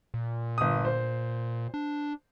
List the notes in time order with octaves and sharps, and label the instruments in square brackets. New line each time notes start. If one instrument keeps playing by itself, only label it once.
[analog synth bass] A#2
[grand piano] G1 D#6
C5
[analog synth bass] D4